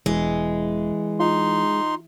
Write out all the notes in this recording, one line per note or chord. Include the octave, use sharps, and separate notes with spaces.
E1 E3 G#3
D#4 F4 C6